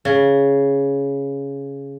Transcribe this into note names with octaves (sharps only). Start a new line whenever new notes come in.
C#3